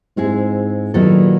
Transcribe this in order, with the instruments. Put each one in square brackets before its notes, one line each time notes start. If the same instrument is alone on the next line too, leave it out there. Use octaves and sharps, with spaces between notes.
[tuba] G#2 [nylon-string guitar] G#3 C4 E4 G#4
[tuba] A#2 [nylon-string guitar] D#3 F#3 B3 E4 A4